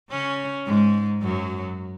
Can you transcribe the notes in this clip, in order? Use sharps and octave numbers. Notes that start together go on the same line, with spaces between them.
C#3 C#4
G#2 G#3
F#2 F#3